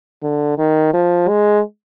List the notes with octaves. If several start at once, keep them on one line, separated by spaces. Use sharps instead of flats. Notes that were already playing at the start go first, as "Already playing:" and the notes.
D3
D#3
F3
G#3